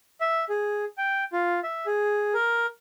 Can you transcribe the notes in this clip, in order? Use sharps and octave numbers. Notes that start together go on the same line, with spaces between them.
E5
G#4
G5
F4
E5
G#4
A#4